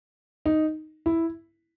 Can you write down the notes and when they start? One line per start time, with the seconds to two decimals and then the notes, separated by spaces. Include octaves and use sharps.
0.46 D#4
1.06 E4